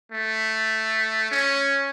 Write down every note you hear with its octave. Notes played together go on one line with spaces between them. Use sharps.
A3
C#4